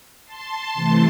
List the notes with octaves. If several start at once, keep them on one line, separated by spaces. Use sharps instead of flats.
A5 C6
C3 E3 A3